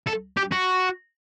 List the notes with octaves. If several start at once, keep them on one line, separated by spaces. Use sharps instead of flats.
A4
G4
F#4